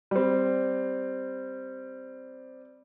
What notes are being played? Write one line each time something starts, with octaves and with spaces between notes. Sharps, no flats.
G3 C4